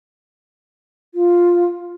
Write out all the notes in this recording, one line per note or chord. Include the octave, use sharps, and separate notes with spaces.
F4